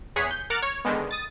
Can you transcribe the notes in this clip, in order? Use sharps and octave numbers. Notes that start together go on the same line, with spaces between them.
E2 G#4 C#5 F#5 B6
G6
A#4 F#5 D6 F6 A6
C#5 C#6
D3 D#3 G#3 B3
D#6 A6